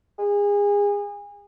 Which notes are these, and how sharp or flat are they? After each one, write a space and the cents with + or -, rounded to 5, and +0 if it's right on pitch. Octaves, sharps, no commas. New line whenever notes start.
G#4 -30